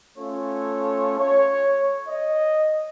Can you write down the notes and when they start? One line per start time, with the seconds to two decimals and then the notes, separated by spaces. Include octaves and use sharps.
0.18 A3 C#4 F4 A4 C#5
1.19 C#5
2.09 D#5